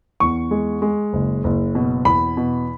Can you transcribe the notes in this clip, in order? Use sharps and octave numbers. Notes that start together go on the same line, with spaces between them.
E2 C#6
G#3
G#3
F#1
F#1
B2
E2 B5
B2